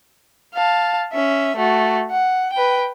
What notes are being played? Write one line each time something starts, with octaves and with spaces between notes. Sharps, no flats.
F5 A5
C#4 E5
A3 F#4
F#5
B4 G5